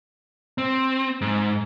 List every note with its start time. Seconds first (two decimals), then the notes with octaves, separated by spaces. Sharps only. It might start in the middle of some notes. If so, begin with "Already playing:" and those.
0.58 C4
1.21 G#2